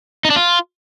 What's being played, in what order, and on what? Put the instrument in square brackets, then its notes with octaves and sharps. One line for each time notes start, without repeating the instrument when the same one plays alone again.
[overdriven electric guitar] D#4
D4
F4